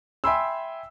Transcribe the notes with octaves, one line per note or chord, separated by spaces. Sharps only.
E5 G5 G#5 B5 C6 E6